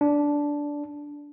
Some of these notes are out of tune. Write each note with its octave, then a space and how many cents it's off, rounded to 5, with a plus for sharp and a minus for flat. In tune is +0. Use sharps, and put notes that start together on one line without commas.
D4 -10